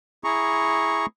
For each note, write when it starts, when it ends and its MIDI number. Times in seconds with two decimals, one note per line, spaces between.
0.24 1.06 64
0.24 1.06 68
0.24 1.06 82
0.24 1.06 85